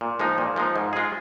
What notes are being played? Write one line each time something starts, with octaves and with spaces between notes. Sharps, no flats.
A#2
F3 G#3 D#4
A#2
F3 G#3 D#4
G#2
G#3 F4 G#4